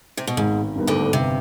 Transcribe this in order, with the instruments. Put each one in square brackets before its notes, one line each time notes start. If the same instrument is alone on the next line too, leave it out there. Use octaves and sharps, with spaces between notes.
[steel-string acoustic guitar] C3
B2
[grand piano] G#1 [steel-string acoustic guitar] G#2
[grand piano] G2 D#3 B3
[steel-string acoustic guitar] D2 D3
[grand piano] G1 [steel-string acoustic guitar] C3